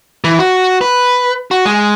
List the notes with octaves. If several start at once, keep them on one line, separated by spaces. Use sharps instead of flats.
E3
F#4
B4
F#4
G#3